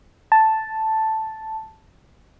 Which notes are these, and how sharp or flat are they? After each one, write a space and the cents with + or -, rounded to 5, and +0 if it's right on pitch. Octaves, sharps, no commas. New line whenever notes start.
A5 +0